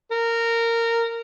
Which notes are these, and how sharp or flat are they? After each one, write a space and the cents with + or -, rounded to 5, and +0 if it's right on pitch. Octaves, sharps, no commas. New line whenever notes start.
A#4 -15